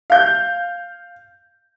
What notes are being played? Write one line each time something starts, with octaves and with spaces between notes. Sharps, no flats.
F5 G6